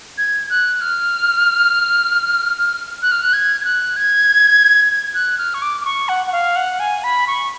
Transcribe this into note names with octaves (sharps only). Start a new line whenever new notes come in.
G#6
F#6
F6
F#6
F6
F#6
G#6
G#6
F#6
G#6
G#6
F#6
F6
C#6
D6
D6
C#6
F#5
F#5
F5
F#5
G#5
B5
C#6